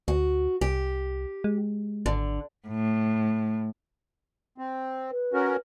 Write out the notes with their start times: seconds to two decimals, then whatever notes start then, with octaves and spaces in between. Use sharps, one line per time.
0.08 D2 F#4
0.61 C2 G4
1.44 G#3
2.06 G#1 D3
2.67 A2
4.58 C4
5.11 B4
5.34 C#4 F#4 A#4